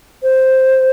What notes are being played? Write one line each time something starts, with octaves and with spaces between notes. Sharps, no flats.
C5